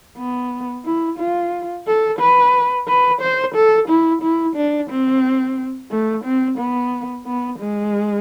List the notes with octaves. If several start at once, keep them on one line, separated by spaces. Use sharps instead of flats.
B3
E4
F4
A4
B4
B4
C5
A4
E4
E4
D4
C4
A3
C4
B3
B3
G#3